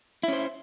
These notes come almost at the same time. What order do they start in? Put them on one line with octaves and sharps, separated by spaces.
E4 C#4 C5